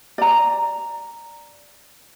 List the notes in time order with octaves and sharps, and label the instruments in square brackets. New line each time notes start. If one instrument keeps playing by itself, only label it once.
[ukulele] D5 A#5